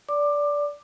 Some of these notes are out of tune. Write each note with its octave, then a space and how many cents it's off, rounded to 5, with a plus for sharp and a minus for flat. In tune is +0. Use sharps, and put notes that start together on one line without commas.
D5 -15 D6 +15